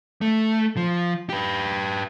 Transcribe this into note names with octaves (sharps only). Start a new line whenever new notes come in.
A3
F3
G4 B4